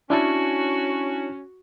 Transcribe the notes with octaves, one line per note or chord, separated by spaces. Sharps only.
C#4 D4 E4 F#4 A5